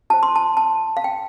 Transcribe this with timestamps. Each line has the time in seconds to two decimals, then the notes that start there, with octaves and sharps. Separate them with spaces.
0.10 F4 C5 A5
0.23 C6
0.36 A5
0.57 A5
0.97 F5
1.04 G5